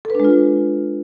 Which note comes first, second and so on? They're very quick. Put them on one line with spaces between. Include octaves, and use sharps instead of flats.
A4 B4 D4 G#3 F4